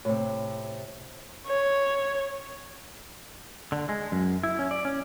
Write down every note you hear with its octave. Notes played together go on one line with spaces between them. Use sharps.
A2 C3
C#5
D3
G#3
F#2
E4
C#4
D5
C#4